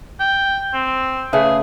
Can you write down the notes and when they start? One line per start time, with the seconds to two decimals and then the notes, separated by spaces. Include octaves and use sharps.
0.20 G5
0.74 C4
1.33 C#3 A3 G#4 B4